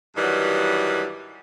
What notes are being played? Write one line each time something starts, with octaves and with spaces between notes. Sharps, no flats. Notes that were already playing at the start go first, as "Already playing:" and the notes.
G2 D#3 E3 F#3 G3